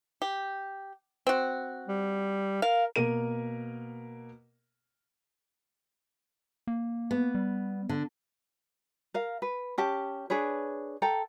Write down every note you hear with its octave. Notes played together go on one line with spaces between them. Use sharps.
G4
C4 F#4
G3
A#4 F5
B2 A#3 A#4 D#7
A#3
B3
G3
D3
A#4 F5
B4
C#4 G4 A5
D4 G#4 B4 C#5
A4 G5 A#5